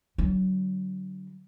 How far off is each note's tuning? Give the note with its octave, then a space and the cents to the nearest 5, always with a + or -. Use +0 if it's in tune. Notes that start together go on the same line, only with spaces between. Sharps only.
D3 +0 F#3 +25